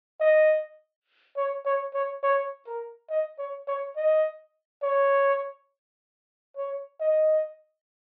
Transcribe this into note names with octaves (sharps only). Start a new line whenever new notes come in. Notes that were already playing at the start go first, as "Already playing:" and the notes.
D#5
C#5
C#5
C#5
C#5
A#4
D#5
C#5
C#5
D#5
C#5
C#5
D#5